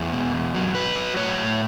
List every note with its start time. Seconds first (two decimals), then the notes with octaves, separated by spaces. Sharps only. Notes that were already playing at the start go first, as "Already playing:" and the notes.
Already playing: E2 C#5
0.13 B2
0.34 E2
0.55 F#3
0.75 F#3 B4
0.95 F#3
1.16 A2 C#5
1.37 A2